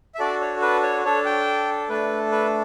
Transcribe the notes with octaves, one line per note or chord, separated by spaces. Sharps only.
E5
D4 F#4 A4 D5
C#5
B4
C#5
D4 A4 C#5
G5
A3 D4 A4 B4
B4